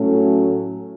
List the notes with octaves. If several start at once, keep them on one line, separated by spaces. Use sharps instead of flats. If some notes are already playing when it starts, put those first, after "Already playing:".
Already playing: A2 F#3 A3 C#4